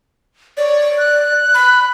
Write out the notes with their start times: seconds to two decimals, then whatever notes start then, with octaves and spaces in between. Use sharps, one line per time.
0.57 C#5 D5
0.98 F#6
1.55 B5